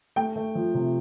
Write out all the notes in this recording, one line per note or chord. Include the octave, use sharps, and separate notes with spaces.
A3 G5
A3
F3
C3